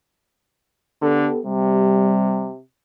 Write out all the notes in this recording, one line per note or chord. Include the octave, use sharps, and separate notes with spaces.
D3 B3 G4 A4
C3 G3